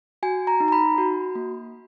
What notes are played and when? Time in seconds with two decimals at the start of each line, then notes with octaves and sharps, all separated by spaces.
0.23 F#4 G#5
0.47 A#5
0.60 D#4
0.68 A#5
0.72 B5
0.98 F#4
1.35 A#3